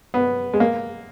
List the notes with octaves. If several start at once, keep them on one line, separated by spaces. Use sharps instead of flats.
B3
G#3
A#3